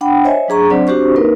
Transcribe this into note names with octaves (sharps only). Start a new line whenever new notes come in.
D4 F#5 G5 B5
C5 C#5 D#5 E5 G#5
F#3 D4 G#4 A#5 C#6
F#3 C4 D4 C5 D5 F#5
C4 D4 F#4 G4 C5 C#6
A#3 D#4 A#4 B4